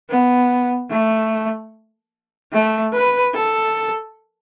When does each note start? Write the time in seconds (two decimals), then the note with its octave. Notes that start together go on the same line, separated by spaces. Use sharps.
0.10 B3
0.90 A3
2.52 A3
2.93 B4
3.34 A4